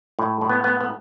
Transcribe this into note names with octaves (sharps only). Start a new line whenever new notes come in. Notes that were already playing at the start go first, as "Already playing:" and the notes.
A2
A2
B3
B3
B3